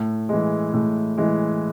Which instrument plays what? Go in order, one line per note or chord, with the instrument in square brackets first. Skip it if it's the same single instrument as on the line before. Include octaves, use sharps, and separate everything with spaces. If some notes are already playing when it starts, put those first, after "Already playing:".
Already playing: [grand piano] A2
E3 G#3
A2
E3 G#3